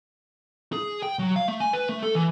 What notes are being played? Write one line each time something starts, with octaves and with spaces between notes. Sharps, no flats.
G#4
G5
F#3
F5
A3
G#5
B4
A3
A4
E3